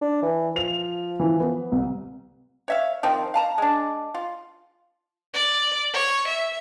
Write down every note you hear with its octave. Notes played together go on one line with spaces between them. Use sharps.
D4
E3
F3 F7
E3
B3
C2
C#5 E5 F5
D#3 F3 C4
F5 A5 A#5
G#3 D4
F4
D5
C#5
E5